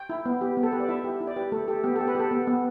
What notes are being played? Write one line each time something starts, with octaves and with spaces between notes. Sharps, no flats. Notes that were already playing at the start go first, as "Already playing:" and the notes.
Already playing: G5
E4
B3
G4
B3
A4
G4 B4
D5
E4 E5
G4
E4
D5
G4 B4
A3 A4
G4 A4
B3 G4
A4
G4
B4
G4 A4
B3
B3